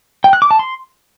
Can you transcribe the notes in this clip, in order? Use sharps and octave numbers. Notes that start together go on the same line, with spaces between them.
G5
F#6
D6
A5
C6